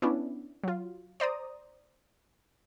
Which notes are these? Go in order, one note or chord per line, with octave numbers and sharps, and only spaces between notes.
B3 C#4 D4 E4
F#3 F4
C5 D5 A#5 D#6